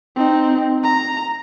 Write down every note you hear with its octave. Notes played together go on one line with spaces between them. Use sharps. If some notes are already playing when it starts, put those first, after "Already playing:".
C4 D#4
A#5